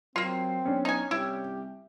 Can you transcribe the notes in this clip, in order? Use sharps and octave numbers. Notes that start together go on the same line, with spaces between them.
F#3 A#3 C4 F4 C7
B1 C#4 D4
D#4 G#5
C2 E4 G4